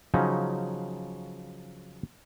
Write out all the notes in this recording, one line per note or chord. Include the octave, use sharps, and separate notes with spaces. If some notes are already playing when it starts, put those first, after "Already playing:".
C#3 F3 F#3 C#4 D#4